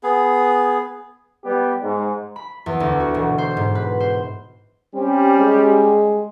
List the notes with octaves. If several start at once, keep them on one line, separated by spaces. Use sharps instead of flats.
B3 G#4
G3 B3 G4
G#2
B5
E2
D2
F#4
E1
C5
G#2
B4
C5
G3 C4 C#4 G4
G#3